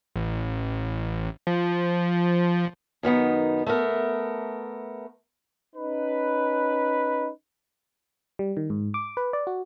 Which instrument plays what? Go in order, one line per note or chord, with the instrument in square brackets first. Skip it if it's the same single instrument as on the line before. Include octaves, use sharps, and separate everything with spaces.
[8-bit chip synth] A1
F3
[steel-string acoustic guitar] F#2 D#3 B3 D#4
A3 B3 A#4
[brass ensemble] C#4 D#4 B4
[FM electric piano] G3
D#3
G#2
D6
B4
D5
F#4